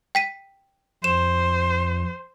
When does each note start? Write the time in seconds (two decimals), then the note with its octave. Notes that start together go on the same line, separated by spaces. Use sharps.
0.15 G5 B6 D#7
1.04 F2 C5 E7